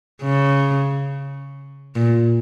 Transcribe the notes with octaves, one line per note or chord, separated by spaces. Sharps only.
C#3
A#2